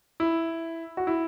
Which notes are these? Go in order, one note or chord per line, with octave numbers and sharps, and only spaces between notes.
E4
F#4
E4